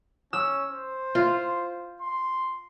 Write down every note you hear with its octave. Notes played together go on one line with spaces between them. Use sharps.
C#4 E6
C5
F4
C6